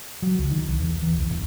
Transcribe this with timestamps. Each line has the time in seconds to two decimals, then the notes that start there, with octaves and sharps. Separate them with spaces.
0.22 F#3
0.39 C#2
0.51 D#3
0.68 C2
0.80 E2
1.02 E2
1.18 C2
1.30 D1